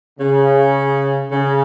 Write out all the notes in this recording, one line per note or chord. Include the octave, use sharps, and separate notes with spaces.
C#3
C#3